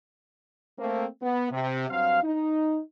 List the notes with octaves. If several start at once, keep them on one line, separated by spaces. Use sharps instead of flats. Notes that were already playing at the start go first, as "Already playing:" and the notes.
A3 A#3 C4
B3
C3
G2 F#3 C4 F5
D#4